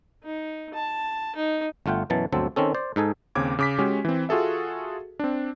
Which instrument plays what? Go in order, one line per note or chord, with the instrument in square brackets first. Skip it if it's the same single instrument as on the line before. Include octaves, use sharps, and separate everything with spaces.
[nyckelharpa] D#4
A5
D#4
[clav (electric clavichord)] G1 A3 F4 F#5 G5
F#2 B2 E3 F#3 A5
G1 D2 F#3 C4 A4
D#3 C4 C#4 A4
C5 D5
G#2 D#4 A4 G#5
[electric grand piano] D#2 C#3 C4 D6 G#6
C#3 D6 B6
G#3 C#4 F#4 G4
E3 C4
F4 F#4 G#4 A4 E5
C4 D4